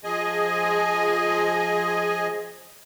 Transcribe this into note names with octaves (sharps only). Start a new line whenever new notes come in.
F3 G#4 D#5 G#5